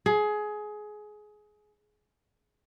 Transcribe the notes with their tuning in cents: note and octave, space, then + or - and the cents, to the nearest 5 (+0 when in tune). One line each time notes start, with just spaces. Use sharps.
G#4 +20